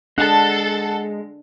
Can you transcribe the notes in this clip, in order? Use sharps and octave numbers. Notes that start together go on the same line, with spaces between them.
G#3 D4 A4 F#5 A5